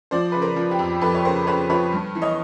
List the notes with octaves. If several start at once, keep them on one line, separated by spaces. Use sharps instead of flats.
F3 C5 D5
C#3 B4
A#4 C5
F3
G4
F2
F2 A4 B4
C#5
C#3 A#4 C5
C#3 B4 C#5
F3 B4 C#5
G2
E3
C#5 D#5